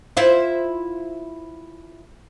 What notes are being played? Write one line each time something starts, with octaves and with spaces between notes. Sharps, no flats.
E4 F4 C5